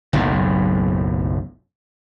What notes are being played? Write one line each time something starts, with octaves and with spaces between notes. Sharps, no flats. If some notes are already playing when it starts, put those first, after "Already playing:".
F#1 B1 A2